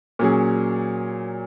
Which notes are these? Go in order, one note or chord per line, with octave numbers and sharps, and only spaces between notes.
A#2 F#3 C#4 G#4